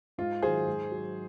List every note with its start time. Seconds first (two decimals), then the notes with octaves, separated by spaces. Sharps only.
0.18 G#2 F4
0.42 D#3 F#3 G#4 C5
0.67 G#2
0.91 F#3